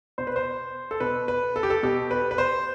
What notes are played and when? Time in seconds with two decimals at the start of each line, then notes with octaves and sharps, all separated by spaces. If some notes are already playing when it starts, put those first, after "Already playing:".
0.18 B2 C5
0.27 B4
0.36 C5
0.91 A4
1.00 B2 B4
1.28 B4
1.56 A4
1.63 G4
1.70 A4
1.83 B2 G4
2.11 B4
2.31 B4
2.38 C5